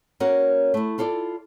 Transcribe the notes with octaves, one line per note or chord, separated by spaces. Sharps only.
A#3 C#4 F#4 A#4
A3 E4
E4 F4 A4 C#5 D5